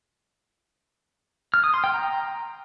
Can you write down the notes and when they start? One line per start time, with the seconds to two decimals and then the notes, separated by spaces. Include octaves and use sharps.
1.54 F6
1.64 D#6
1.74 C6
1.84 G5
1.94 A#5